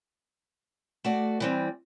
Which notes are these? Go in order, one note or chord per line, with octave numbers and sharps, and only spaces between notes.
A3 F#4 D5
E3 G3 C4